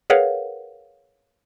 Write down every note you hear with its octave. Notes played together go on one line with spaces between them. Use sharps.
G#4 A#4 B4 C#5 F5 F#5